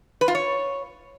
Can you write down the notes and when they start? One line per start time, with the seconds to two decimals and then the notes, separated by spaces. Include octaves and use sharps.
0.21 B4
0.28 F4
0.35 C#5